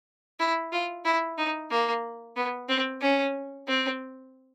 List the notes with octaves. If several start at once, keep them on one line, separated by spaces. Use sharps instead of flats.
E4
F4
E4
D#4
A#3
B3
C4
C#4
C4